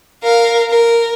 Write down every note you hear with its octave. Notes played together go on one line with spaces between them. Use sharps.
A#4 F5
A#4